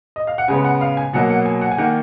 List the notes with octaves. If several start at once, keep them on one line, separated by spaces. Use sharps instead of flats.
D#5
F5
F#5
C#3 G#3 B3 G#5
F#5
F5
G#5
B2 F#3 A#3 F#5
F#5
G#5
F#5
G#5
D#3 A#3 F#5